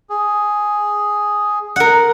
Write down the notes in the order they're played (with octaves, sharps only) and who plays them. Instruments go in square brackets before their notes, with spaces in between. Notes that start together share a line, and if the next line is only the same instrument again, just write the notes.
[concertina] G#4
[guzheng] A#4 F#5